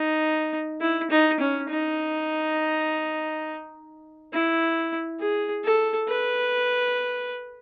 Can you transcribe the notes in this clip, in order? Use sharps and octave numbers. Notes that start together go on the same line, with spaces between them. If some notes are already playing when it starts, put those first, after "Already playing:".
Already playing: D#4
E4
D#4
C#4
D#4
E4
G#4
A4
B4